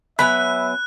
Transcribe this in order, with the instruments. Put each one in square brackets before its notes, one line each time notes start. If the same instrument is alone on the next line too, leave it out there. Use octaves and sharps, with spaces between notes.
[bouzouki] F#3 B3 G#5 [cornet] E5 [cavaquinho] B5 [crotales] F#6